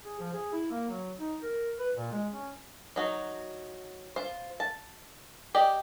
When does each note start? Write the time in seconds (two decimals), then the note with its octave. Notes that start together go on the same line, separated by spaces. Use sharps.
0.05 G#4
0.20 F3
0.34 G#4
0.52 E4
0.71 A#3
0.89 F#3
1.20 D#4
1.42 A#4
1.79 B4
1.95 A#2
2.12 G#3
2.33 C#4
2.96 F#3 D#4 F#4
4.16 F4 C5
4.60 A5
5.55 G4 D5 D#5